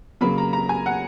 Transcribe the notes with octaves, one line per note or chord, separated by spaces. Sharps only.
C#3 F#3 A#3 B5
A#5
A#5
G#5
F#5